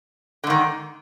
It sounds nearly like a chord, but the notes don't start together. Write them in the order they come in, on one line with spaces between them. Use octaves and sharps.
D3 G#2 D#3